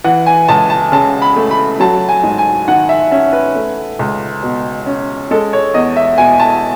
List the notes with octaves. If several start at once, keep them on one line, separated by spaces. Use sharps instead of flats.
E3 F#5
G#5
C#2 A5
A5
C#3 A5
B5
A3
B5
F#3 A5
G#5
G#2
G#5
D#3 F#5
E5
C#4 E5
B4
A3
C#2
B2
C#4
G#3 A4
C#5
E2 D#5
E5
B2 G#5
A5